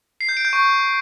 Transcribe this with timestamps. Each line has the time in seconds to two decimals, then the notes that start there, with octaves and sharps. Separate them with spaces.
0.21 C7
0.29 G6
0.37 D7
0.45 G6
0.53 C#6